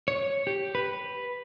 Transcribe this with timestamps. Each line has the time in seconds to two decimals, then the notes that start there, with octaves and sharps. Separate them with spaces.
0.08 C#5
0.47 G4
0.75 B4